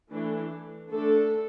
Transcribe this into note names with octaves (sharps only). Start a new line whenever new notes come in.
E3 A3 D4
D3 A3 D4 A4